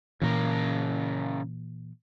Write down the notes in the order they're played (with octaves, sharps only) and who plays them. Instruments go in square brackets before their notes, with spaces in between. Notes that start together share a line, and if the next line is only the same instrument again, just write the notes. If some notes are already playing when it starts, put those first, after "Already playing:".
[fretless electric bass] A#2 E3 [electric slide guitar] C#3 A#4